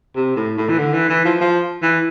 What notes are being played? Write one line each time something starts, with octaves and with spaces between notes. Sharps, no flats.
C3
A2
A2
E3
D3
E3
E3
F3
F3
E3